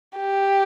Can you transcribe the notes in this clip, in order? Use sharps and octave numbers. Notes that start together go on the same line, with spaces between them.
G4